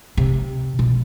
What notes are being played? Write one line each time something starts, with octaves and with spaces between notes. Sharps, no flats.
C3
B2